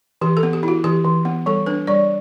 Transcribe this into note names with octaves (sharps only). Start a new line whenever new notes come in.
E3 G4
A4
B3
G4
E4 F#4
E3 G4
E3
B3
G3 A4
D4 B4
G3 D5